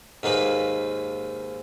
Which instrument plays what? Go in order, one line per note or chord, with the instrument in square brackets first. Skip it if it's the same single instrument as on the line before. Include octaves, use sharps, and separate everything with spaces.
[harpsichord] D#2 G#2 A#3 B4